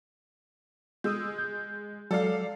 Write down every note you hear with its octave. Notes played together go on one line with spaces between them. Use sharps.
G#3 D#6 E6 G6
G6
F#3 G#3 A4 D5 F5